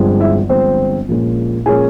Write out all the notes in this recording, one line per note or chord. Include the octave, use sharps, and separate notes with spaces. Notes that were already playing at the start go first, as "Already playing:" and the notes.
Already playing: G1 G2 F3 G#3 C4
E4 E5
G1 G2 F3 G#3 C4 C5
A#1 A#2 F3 G#3 C#4
A#2 F3 G#3 C#4 G#4 G#5